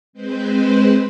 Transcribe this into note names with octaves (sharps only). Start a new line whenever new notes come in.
G#3 C4 B4 C5